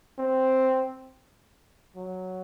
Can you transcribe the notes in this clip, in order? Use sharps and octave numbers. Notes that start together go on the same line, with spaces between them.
C4
F#3